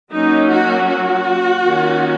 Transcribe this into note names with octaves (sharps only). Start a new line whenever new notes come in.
F#3 A#3 C#4 D#4
F#4
F#4
D#3 A#3 C#4